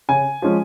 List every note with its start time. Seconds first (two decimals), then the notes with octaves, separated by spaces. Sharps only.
0.09 C#3 G#5
0.42 F3 G#3 C#4